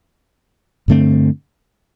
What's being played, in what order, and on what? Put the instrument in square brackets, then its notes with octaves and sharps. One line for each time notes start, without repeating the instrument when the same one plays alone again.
[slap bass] G2 D3 A3 C4